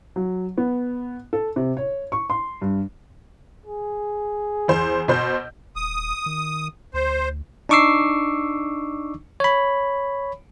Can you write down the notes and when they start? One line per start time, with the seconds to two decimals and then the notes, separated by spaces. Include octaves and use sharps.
0.16 F#3
0.58 B3
1.33 A4
1.56 C3
1.77 C#5
2.12 C#6
2.30 C6
2.62 G2
3.66 G#4
4.68 E2 C5
5.08 B2 C5 G6
5.76 D#1 D#6
6.26 D#3
6.94 D2 C5
7.69 D4 D#4 C#6 D6 E6 C7
9.40 C#5 B5